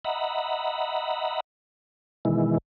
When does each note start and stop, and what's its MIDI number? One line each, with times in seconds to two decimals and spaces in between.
0.05 1.40 75
0.05 1.40 76
0.05 1.40 78
0.05 1.40 82
0.05 1.40 83
2.25 2.58 47
2.25 2.58 51
2.25 2.58 52
2.25 2.58 56
2.25 2.58 64